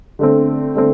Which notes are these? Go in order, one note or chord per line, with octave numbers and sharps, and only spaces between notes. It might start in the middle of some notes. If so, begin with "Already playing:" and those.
D3 A3 C4
D3 A3 C4